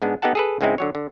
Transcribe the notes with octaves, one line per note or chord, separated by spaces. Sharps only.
G#2 G#3 B3 D4
B3 D#4 G4 A4 F#5 A5
G#4 A4 B4
C#2 G#2 G#3 C4 D#4 E4
D3 F#3 C#5
D3